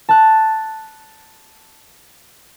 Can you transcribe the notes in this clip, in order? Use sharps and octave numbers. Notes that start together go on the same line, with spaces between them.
A5 F#6